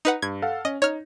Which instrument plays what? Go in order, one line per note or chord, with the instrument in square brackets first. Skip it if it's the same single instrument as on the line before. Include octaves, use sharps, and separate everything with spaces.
[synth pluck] D#4 B4 F#5
[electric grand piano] G2 [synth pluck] G#6
[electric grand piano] A4 F5 F#5
[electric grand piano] C#4 [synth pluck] D#5
[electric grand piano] D#4 [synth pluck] C#5 F6